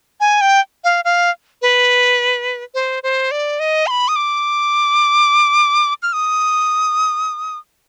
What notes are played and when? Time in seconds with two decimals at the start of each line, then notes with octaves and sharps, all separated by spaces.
0.20 G#5
0.41 G5
0.84 F5
1.05 F5
1.62 B4
2.75 C5
3.03 C5
3.31 D5
3.60 D#5
3.87 C6
3.91 B5
4.08 D#6
4.16 D6
6.03 F6
6.13 D#6